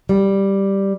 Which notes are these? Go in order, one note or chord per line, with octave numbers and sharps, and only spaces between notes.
G3